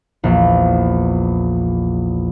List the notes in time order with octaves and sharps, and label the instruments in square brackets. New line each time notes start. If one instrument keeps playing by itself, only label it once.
[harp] A#1 E2